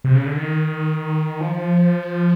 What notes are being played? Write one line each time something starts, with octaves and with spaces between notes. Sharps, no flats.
C3
C#3
D3
D#3
F3